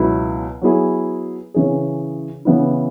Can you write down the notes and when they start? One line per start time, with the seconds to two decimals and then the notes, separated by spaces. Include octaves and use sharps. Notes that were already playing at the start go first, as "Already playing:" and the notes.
Already playing: C#2 B2 F#3 B3 E4
0.61 F#3 B3 E4 G#4
1.54 C#3 E3 C#4 G#4
2.45 C#3 E3 B3 E4